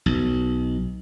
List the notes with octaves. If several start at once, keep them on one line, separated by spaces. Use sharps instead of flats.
B1